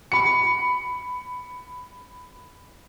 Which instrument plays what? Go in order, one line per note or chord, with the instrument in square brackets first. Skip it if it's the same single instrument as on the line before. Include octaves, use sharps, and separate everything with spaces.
[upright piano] B5 C#7